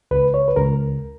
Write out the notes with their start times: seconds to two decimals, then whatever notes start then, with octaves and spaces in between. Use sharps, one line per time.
0.11 C#2 B4
0.34 C#5
0.48 B4
0.56 C#2 A#4